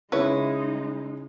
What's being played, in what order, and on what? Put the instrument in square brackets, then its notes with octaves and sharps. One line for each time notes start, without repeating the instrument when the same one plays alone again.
[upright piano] C#3 [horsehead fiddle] G#3 D#4 [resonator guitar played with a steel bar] E4 [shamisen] B4 C#5